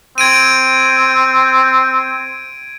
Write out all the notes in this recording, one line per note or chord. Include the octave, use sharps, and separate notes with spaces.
C4 G#6 D7 D#7